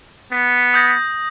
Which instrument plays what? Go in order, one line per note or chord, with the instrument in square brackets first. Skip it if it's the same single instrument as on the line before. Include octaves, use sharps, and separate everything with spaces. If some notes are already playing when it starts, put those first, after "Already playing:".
[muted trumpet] B3
[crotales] D#6 G6 A#6